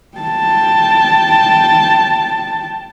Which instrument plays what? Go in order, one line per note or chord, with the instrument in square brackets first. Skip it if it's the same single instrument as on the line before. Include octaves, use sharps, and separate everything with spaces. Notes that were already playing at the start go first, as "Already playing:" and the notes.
[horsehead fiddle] G5 A5